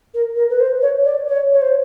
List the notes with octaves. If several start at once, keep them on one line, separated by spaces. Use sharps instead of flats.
A#4
A#4
B4
C5
C#5
D5
C#5
C#5
C5